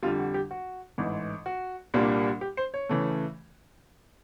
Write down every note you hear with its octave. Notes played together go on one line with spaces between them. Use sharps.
F2 D3 G3 F4
F#4
G4
F#4
A1 G#2 E3
F#4
C2 A#2 G3 A#3 D4
G4
C5
C#5
C#3 E3 A3